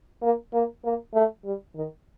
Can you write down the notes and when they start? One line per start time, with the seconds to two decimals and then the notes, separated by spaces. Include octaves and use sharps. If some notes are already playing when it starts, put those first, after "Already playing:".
0.22 A#3
0.53 A#3
0.84 A#3
1.14 A3
1.44 G3
1.75 D#3